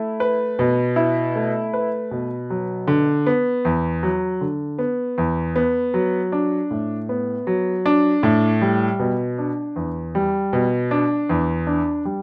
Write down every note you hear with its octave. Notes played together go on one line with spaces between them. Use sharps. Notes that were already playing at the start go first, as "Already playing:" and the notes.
Already playing: A3 E4
B4
B2
E4
A3
B4
B2
F#3
D3
B3
E2
F#3
D3
B3
E2
B3
F#3
D4
A2
B3
F#3
D4
A2
G3
B2
D4
E2
G3
B2
D4
E2
D4
G3